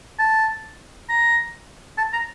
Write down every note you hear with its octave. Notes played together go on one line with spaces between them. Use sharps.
A5
A#5
A5
A#5